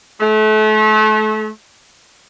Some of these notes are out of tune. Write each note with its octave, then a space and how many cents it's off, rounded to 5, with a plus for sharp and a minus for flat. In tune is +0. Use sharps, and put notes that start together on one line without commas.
A3 -35